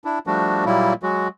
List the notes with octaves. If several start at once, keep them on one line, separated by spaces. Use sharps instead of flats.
D4 E4
F3 G3 A3 D4 F#4
A#2 F#3 G3 A#3 E4
F#3 G#3 F#4